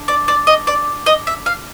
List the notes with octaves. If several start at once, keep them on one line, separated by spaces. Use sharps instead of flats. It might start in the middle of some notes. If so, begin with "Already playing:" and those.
Already playing: D4
D5
D5
D#5
D5
D#5
E5
F5